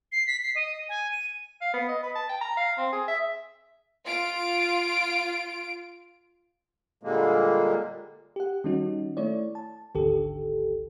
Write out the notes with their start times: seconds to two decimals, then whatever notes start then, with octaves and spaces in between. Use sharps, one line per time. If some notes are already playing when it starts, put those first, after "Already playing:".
0.12 C7
0.27 B6
0.43 C7
0.55 D#5
0.89 G#5
1.12 D#7
1.61 F5
1.74 B3
1.89 D#5
2.03 B4
2.15 A5
2.29 G5
2.41 A#5
2.57 F5
2.78 C4
2.93 G#4
3.08 E5
4.06 F4 D7
7.03 A#2 D3 G3 G#3 A#3
8.36 G4 F#5
8.64 D#3 G3 C#4 D#4 F#4
9.17 A3 E4 C#5 D5
9.55 A5
9.95 G#1 D2 D3 D#3 G4 A4